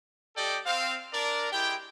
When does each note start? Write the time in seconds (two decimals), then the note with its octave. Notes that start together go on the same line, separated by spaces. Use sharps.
0.36 A3 G4 A4 D5 D#5 G5
0.66 C4 F5
1.13 D4 A#4 D5
1.52 G#3 E4 G4 G5